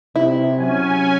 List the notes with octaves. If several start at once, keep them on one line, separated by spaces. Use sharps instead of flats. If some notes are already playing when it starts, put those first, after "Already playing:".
C3 E4
F#3 C#4 G#5